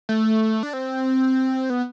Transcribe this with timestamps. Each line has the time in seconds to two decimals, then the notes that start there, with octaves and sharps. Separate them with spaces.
0.09 A3
0.63 D4
0.73 C4
1.70 B3